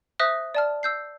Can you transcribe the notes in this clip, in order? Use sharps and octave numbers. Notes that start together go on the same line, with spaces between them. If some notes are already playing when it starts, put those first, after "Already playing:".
C5 E5 D#6 F#6 A#6
D5 A5 F6
E6 G6 C7